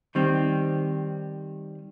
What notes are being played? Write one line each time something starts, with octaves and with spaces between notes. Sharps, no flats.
D#3 G3 C4